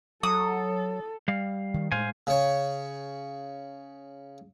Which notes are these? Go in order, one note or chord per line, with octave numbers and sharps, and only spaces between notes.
F#3 A4 D#6
G3 F5
D#3
A2 G#3 A3 C5 F5 G#5
C#3 C#5